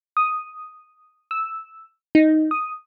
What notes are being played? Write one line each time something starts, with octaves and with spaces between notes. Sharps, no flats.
D#6
E6
D#4
D#6